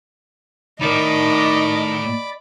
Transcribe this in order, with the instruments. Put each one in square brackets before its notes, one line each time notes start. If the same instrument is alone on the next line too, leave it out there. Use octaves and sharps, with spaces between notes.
[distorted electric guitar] A2 [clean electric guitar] D#3 D#4 [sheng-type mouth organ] D5 B5 D6 [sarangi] D#5